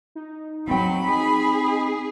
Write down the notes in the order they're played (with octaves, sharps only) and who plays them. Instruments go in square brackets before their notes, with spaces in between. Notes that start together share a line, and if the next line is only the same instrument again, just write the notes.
[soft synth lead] D#4
[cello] F#3 [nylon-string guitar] C4 G5 [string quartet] B5
[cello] G#4